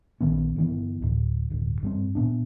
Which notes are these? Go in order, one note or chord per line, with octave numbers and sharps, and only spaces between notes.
A#1 D#3 B3 C#4
G1 E3 B3
D1
D1 G1
G2 G3 C4
A#2 B3 D4